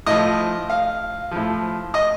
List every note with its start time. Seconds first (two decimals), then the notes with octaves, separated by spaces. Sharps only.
0.06 A2 F3 D#5
0.70 F5
1.31 A2 F3
1.94 D#5